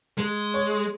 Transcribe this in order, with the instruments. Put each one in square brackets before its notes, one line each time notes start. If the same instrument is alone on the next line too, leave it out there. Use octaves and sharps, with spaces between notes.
[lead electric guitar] G#3
[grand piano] C#5